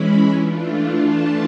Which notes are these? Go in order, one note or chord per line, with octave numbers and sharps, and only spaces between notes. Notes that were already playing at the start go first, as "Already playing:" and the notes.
Already playing: E3 G#3 C#4 E4 B5
E3 A3 D4 F4
A5